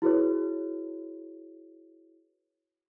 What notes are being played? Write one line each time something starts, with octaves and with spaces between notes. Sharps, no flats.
E4 F#4 G#4 B4 C#5